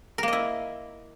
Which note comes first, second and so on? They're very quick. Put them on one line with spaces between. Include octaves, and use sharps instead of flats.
A#4 A#3 D#5 E4